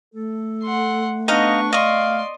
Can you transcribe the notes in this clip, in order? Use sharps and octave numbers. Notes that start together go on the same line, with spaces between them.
A3 A4
F#5 C6
B3 D4 D#4 D#5 F5 C#6
D5 D#5 F5 C6 C#6